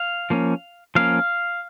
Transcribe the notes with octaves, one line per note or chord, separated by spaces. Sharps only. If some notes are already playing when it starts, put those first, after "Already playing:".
Already playing: F5
F3 A#3 C#4
F3 A#3 C#4 F5